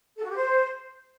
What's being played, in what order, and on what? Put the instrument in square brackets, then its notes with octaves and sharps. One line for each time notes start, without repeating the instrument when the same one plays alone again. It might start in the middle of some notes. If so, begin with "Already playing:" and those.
[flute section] A4
F#4
G4
C5